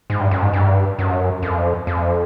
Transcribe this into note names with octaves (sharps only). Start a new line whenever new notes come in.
G#2
G2
F#2
G#2
G2
F#2
F2
F2